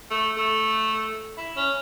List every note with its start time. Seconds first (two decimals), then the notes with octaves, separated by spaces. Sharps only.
0.11 A3
0.37 A3
1.37 E4
1.56 C#4